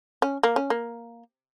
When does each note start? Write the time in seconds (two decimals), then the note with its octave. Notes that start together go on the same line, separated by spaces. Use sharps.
0.22 C#4
0.43 A#3
0.56 C#4
0.70 A#3